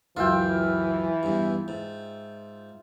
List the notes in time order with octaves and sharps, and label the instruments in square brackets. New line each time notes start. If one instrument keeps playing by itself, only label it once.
[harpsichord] C#2 F#2 B4 [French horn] E3 [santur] F4 E5 G5
[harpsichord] E2 G2
G#2